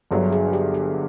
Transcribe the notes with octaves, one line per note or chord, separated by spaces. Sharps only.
G1 G2 D3 F#3 G#4
G#4
G4
G4